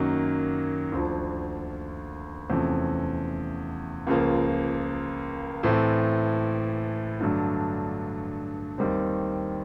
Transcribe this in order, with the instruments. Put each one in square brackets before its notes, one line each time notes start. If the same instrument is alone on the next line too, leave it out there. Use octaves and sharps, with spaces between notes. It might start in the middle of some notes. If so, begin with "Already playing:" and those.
Already playing: [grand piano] F#2 D#3 F#3 A#3 C#4
D2 D3 F3
E2 C3 F3 A3 C#4
C#2 C#3 F3 A#3
A2 E3 A3 C4 E4
G2 D3 F#3 A3
D#2 D#3 G3 C4